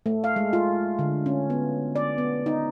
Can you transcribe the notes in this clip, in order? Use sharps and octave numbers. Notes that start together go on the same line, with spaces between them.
A3
F5
G#3
F4
D3
C#4
B3
D5
B3
D#4